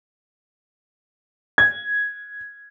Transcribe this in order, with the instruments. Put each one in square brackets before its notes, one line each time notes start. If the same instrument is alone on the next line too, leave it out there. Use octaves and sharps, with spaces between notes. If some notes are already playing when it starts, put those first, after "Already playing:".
[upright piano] G#6